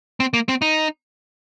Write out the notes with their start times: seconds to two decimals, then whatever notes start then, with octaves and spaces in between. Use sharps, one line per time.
0.20 C4
0.34 A#3
0.49 C4
0.62 D#4